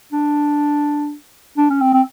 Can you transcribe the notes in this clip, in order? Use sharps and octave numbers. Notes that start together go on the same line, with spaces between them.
D4
D4
C#4
C4
C4